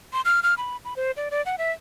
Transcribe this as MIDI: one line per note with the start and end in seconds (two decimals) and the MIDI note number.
0.13 0.21 84
0.25 0.40 89
0.43 0.54 89
0.58 0.77 83
0.85 0.94 83
0.96 1.11 72
1.17 1.29 74
1.31 1.44 74
1.46 1.56 78
1.58 1.72 76